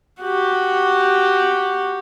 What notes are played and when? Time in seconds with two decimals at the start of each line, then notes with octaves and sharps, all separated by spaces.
0.21 F#4 G4